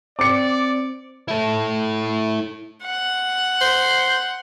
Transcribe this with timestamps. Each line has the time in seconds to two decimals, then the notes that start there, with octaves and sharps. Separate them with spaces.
0.19 C4 D5 D6 C#7
1.28 E4 A4
2.84 F#5
3.61 C5